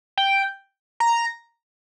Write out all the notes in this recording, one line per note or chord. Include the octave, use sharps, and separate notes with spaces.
G5
A#5